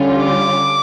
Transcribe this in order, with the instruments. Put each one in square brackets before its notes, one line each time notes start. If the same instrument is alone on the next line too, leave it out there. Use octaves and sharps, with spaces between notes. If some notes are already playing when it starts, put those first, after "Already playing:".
Already playing: [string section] D3 G3 C#4 F4
[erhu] D6